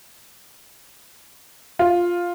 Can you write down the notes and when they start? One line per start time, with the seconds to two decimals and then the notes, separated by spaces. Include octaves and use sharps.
1.79 F4